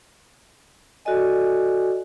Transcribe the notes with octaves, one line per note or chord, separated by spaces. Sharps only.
F#4 A4 D5 D#5 G#5